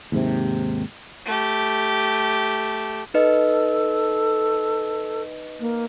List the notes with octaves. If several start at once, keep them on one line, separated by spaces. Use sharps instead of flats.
D#2 G#2 C3
A3 G4
D#4 A4 B4 D#5
A#3